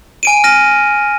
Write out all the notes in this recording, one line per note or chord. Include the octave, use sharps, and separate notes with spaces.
G#5 D7 D#7
F6 A#6 D#7